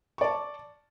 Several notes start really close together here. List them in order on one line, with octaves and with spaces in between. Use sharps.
C#6 D5 A5